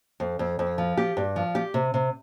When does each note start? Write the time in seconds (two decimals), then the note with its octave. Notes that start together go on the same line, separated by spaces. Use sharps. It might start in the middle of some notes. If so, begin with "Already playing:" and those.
0.20 F2
0.39 F2
0.59 F2
0.78 F3
0.97 G4
1.17 G2
1.36 F3
1.55 G4
1.74 C3
1.94 C3